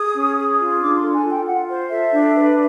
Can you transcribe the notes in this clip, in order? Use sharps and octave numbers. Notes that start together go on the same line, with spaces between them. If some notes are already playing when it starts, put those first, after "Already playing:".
Already playing: G#4 D#6
C#4
G#4
F4
D4 D6
C6
A4
G#5
F4
G5
F4 F#5
C5
A4 E5
D4
B4